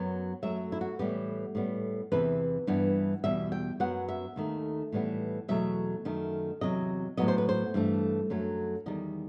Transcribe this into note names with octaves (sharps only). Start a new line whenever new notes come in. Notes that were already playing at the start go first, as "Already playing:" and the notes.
Already playing: F#2 F#3 B3
F#2 F#3 A3 E5
E4
F#4
A2 E3 G3 B3 G4
A2 G3 B3
E2 C3 E3 B4
G2 E3 G3 B3
E2 B2 G3 E5
G5
F#2 F#3 B3 F#5
E5
D#2 D#3 A3
A2 E3 G3 B3
E2 B2 F#3 A3 E5
F#2 D#3 A3
E2 C3 F#3 D#5
A2 F#3 B3 D#5
C5
B4
C5
G2 E3 A3
F#2 F#3 A3
E2 D#3 G3 D#5